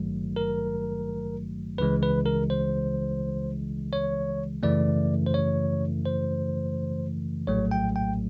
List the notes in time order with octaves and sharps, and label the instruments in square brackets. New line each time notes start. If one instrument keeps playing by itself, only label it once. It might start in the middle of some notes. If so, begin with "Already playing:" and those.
Already playing: [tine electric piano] G#1 G2 D#3 F#3 A3
A#4
C#2 C#3 E3 G#3 B4
B4
A#4
C5
C#5
F#2 C#3 E3 A3 D5
C5
C#5
C5
A#1 A2 F#3 A3 C#5
G5
G5